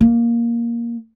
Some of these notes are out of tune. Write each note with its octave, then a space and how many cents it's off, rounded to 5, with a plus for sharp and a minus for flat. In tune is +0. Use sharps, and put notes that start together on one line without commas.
A#3 +5